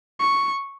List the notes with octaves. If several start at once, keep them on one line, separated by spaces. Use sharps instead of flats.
C#6